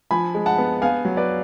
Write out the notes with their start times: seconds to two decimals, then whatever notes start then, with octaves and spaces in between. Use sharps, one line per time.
0.11 F3 G#5 B5
0.35 G#3
0.46 F#5 A5
0.58 B3
0.82 B3 F5 G#5
1.05 F#3
1.17 B4 D5